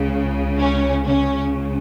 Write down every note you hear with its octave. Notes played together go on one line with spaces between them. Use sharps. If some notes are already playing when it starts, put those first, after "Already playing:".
Already playing: C#2 C#3
C#4
C#2 C#3 C#4